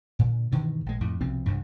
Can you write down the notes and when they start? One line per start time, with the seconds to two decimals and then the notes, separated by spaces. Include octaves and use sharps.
0.19 A#2 D3
0.52 G2 B2 D#3 E3
0.86 A#1 G#3
1.01 F2 A2
1.21 C2 B2 F3 C4
1.46 C2 G2